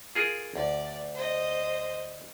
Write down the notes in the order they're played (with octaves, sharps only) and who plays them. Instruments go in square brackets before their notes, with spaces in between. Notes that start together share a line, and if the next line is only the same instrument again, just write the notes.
[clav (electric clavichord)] F4 G#4 A#4
[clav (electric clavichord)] D2 [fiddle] D5
[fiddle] C5 D#5